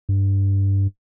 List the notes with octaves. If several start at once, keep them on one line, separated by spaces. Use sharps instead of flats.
G2